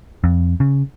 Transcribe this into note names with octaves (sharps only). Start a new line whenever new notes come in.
F2
C#3